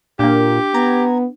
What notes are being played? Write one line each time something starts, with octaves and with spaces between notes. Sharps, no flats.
A#2 A#3 D4 G4
B3 A#5 G#6